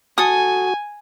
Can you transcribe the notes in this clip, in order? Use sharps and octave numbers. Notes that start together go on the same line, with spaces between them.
F#4 A4 G#5 D#6